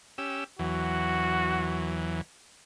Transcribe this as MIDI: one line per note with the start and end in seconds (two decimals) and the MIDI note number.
0.18 0.44 61
0.18 0.44 67
0.18 0.44 88
0.59 2.21 40
0.59 2.21 52
0.59 2.21 54
0.59 1.93 66